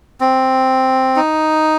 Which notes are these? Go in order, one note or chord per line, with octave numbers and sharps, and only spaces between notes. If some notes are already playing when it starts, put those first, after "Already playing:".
C4
D#4